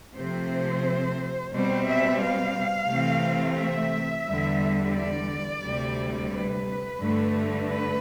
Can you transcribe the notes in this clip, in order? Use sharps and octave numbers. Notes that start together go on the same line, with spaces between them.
C3 F3 A3 C4 C5
B2 G3 C4 C5
E5
F5
C3 E3 A3 C4
E5
E2 D3 G3
D5
D2 C3 G3
B4
G2 D3 A3
B4